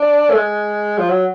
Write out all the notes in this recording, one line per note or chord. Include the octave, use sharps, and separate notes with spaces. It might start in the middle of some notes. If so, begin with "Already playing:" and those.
Already playing: D4
A3
G#3
F3
F#3